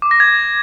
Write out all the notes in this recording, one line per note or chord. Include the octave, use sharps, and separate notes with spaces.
D6
A#6
G#6